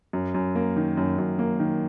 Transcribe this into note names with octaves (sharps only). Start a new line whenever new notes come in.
F#2
F#2
A#3
D#3
F#2
F#2
A#3
D#3